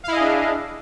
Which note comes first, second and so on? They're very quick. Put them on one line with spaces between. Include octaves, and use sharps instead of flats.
F5 E4 D#5 G#4 D4